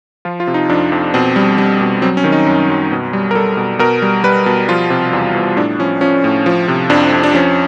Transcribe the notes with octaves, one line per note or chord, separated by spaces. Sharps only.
F3 F4
F4
C3
D#4
F2 D4
F2
B2 C4
G3
G3
B2
F#3 C4
C#4
D#3
D#4
F#2
F#2
B2
G3
A#4
G3 A4
B2
B2 A#4
G3
G3 B4
B2
F3 F4
C3
E2
E2
A2 D4
F3 C#4
F3 C#4
A2
F3
C3
F2 D4
F2
D4
F3 C#4